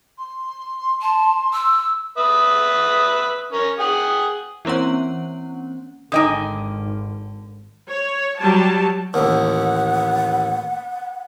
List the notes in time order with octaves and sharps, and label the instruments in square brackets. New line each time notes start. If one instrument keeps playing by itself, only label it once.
[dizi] C6
[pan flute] A5
E6
[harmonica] B4 E5 D#6
C#4 A#4
G#4 F#5 G5
[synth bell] E3 A#3 C4 C#4 F#5
[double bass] G#1 [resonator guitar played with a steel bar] D3 G5 G#5 [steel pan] D#4 D#5 D#6
[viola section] C#5
F#3 G3 A5
[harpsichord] A1 D#2 [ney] F#5